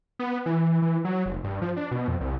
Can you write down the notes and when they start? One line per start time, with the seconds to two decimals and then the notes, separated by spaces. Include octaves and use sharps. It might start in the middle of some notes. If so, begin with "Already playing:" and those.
0.19 B3
0.46 E3
0.82 E3
1.05 F#3
1.26 F1
1.44 G2
1.62 F3
1.77 D4
1.91 B2
2.08 F2
2.21 C2